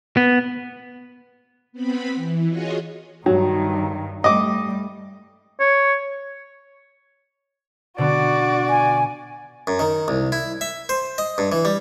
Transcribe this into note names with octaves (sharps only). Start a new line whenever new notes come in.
B3
B3 C4 B5
E3
F4 F#4 G#4 C#5 D#5
G2 D#3 F#3
G3 A3 D#5 D6
C#5
B2 D3 B3 F#4 D5
G#5
F#2
D#3
C2
E4
E5
C5
D#5
G2
E3
G3